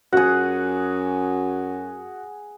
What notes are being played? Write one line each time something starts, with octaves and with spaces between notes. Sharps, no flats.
F#2 F#4 G#4 F#5